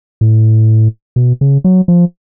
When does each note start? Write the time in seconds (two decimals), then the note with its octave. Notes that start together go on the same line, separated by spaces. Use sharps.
0.21 A2
1.16 B2
1.41 C#3
1.64 F#3
1.88 F3